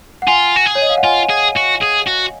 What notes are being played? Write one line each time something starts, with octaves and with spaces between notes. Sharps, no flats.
F#5
F4 G#5
F#4
G#4
C#5
D#5
F5
F#5
F4 G#5
G#4
F#4
G#4
F#4